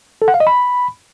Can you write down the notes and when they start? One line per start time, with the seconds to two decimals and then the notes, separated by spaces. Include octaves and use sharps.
0.22 A4
0.28 F#5
0.34 F5
0.40 D#5
0.47 B5